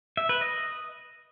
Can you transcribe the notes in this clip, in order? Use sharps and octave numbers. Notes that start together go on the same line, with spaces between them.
E5
B4
D#5